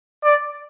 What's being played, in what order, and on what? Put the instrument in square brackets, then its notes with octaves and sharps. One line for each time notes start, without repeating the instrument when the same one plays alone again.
[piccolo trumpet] D5